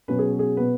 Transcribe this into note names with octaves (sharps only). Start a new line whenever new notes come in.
B2 F#3 C#4 B4
G#4
G#4
B2 B3 B4